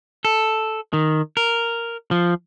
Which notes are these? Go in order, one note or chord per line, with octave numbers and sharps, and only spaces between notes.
A4
D#3
A#4
F3